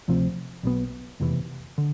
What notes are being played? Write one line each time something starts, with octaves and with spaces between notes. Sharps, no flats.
D2 C3 F3 C4
B1 B2 B3
F1 E2 C3 E3
D3